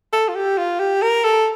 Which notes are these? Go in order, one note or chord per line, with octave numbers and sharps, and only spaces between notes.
A4
F4
G4
F4
G4
A#4
A4